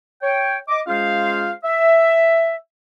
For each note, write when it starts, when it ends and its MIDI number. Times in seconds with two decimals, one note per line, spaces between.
0.22 0.57 73
0.22 0.57 79
0.69 0.81 75
0.69 0.81 86
0.87 1.51 56
0.87 1.51 61
0.87 1.51 65
0.87 1.51 68
0.87 1.51 72
0.87 1.51 77
1.64 2.55 76